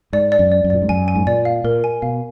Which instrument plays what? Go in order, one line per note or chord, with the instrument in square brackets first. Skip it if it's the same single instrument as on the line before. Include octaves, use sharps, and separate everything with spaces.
[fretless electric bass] G#2 [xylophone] D5
[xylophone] D5
[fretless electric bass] F#2
[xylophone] D5
[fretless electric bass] F#2
[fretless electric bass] A#2 [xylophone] D5
[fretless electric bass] G#2
[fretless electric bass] F#2 [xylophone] G#5
[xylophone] G#5
[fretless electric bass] G#2
[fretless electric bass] A#2 [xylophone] D5
[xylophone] F5
[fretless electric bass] A#2 [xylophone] A#4
[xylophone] G#5
[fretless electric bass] B2 [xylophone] F5